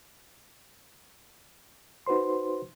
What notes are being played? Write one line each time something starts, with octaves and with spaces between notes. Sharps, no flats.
D#4 F#4 B4 C5 C6